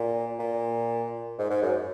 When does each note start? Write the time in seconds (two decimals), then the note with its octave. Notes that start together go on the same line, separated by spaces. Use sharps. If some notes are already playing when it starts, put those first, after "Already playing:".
Already playing: A#2
0.39 A#2
1.39 G#2
1.50 G#2
1.62 F#2